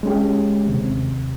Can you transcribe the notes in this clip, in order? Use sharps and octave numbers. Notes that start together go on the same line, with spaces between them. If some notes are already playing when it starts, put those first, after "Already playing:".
G#3 C#4 G4
D#2 C3